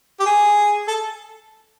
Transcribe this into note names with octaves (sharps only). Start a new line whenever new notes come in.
G4
G#4
A4